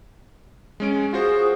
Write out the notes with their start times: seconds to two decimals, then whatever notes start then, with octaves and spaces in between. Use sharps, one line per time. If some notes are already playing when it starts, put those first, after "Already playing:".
0.80 G#3 C#4 D7
1.13 F4 F#4 G#4 C5